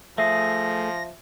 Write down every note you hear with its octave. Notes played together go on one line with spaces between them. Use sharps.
F3 A3 G#4 E5 A#6